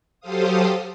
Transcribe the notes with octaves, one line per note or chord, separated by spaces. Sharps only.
F#3 G4 A4 C5 F5 D#6